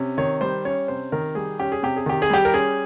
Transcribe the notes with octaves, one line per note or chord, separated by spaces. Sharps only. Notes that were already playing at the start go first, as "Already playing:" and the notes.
Already playing: C3 C#4
D#3 C#5
G3 C5
C#4 C#5
C3 C5
D#3 A#4
G3 G#4
C#4 G4
G#4
C3 G4
G#4
D#3 G4
G#4
G3 G4
A#4
C#4 G#4